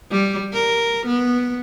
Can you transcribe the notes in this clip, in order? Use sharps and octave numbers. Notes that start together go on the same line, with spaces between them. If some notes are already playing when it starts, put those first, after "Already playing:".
G3
A#4
B3